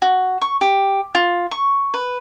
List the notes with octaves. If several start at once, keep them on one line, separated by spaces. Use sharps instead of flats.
F#4
C#6
G4
F4
C#6
B4